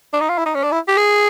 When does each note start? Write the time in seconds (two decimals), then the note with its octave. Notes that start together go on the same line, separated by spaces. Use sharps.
0.13 D4
0.21 D#4
0.29 F4
0.38 E4
0.46 D#4
0.55 C#4
0.63 D4
0.72 E4
0.88 G4
0.97 G#4